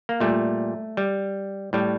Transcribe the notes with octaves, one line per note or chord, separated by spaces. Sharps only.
A#3
A#2 G3 A3
G3
A2 G3